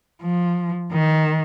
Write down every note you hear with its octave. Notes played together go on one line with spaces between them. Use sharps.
F3
D#3